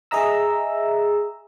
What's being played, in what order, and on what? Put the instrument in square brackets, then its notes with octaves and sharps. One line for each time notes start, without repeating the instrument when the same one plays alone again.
[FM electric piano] G#4 D#5 E5 A#5 E6